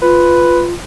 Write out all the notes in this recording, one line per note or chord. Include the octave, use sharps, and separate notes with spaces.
F4 B4